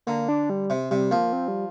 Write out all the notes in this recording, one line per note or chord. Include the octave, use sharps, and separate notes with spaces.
D3 A#3
D4
G3
C3
C3 G3
F3 A#3
C4
G3